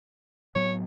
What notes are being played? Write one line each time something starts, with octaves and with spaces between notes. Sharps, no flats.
A2 F#3 B3 C#5